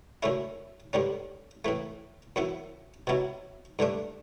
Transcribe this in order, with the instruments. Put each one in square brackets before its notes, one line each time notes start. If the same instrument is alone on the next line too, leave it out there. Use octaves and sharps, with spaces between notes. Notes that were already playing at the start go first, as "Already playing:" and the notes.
[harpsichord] F#2 D3 A3 C#4 E4
G2 D3 G3 C#4
A2 E3 A3
F#2 E3 B3 E4
B2 F#3 C#4 E4
G2 D3 A3 D4